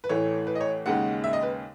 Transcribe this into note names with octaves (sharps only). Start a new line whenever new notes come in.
B4
A1 A2 E3 A3 C#5
B4
D#5
C#5
D#2 C#3 G#3 F#5
E5
D#5
B4